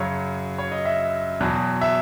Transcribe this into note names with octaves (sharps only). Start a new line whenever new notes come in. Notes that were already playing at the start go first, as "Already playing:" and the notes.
Already playing: F#2 C#3 F#3 C#5
C#5
D#5
E5
E2 B2 F#3
E5